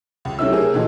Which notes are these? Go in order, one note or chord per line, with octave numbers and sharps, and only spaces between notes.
C#2
C3 F#3 A3 C#4 E4 E6
G4 G#4 A#4
A#2 D3 E3 D#4 F#4 A4